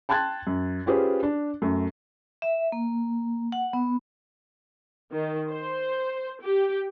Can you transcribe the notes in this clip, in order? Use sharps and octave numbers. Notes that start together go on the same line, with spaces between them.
G5 A5 C6 F#6 G#6 A6
F#2
C#4 F4 G4 G#4 B4 C5
D4
F#2 A3
E5
A#3
F#5
B3
D#3
C5
G4